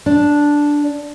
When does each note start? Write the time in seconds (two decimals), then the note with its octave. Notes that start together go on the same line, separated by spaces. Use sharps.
0.06 D4